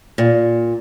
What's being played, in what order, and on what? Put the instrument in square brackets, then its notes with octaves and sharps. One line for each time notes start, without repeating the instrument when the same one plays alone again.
[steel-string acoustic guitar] A#2